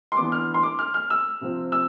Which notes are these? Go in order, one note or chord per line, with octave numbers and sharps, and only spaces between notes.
C6
E3 B3 D4 D6
F6
C6
D6
F6
F6
E6
C3 F3 C4
E6